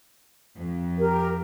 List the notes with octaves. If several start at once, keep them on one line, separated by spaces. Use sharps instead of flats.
F2
G4 A#4